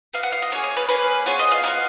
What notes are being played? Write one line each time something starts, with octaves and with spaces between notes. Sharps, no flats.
B3 F#4 F5
F#5
F5
D#5
A#3 C#4 G#4 C#5
C#5
B4
A#3 C#4 G#4 B4
B3 F4 G#4 C#5
D#5
F5
B3 D#4 F#4 F5